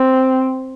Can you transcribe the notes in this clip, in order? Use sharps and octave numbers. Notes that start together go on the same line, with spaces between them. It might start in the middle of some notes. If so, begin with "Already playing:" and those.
Already playing: C4